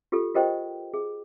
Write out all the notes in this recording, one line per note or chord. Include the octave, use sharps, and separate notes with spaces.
F4 G4 A4
F4 G4 A#4 C5 D#5 G5
G#4